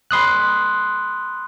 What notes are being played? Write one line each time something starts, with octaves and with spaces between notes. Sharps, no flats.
B5 C6 D#6 F#6